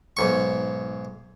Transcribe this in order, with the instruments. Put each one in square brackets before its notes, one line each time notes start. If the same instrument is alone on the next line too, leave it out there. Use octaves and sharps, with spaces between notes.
[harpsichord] B1 G#2 C#6